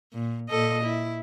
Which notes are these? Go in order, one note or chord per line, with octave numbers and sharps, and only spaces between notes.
A#2
A#2 A4 D#5
E4